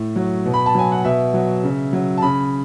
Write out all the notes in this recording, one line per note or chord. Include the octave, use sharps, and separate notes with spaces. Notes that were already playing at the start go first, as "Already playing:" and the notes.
Already playing: A2
F#3
B2
B5
A5
F#3 G#5
F#5
B2 E5
F#3
C#3
F#3
A5
C#3 B5